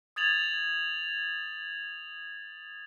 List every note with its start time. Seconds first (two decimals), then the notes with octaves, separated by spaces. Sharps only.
0.16 D#6 G#6 A6 F7 F#7